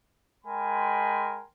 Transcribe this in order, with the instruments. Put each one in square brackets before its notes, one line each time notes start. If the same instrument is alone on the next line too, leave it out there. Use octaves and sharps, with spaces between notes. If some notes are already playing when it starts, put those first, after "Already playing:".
[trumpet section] G#3 A#4 G5 G#5 B5 C6